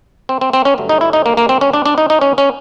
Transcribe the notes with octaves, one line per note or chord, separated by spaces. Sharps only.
C4
C4
C4
C#4
G2 D3 F#3 A3
D#4
E4
D#4
A#3
A#3
C4
C#4
D4
D4
D#4
D#4
C#4
C#4